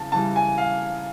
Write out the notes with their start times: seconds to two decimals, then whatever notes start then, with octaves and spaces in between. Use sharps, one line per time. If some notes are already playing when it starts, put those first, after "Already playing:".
Already playing: C#3 E3 A5
0.12 C#3 E3 G3 A5
0.36 G#5
0.58 F5